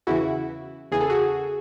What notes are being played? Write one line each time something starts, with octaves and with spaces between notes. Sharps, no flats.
E2 C#3 E3 E4 F#4
E2 C#3 E3 G#4
A4
F#4 G#4